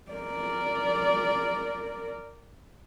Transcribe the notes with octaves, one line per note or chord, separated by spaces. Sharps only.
A#4 D5